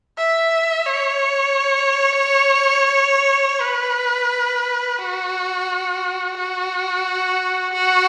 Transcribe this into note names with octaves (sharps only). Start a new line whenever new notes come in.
E5
C#5
B4
F#4
F#4
F#4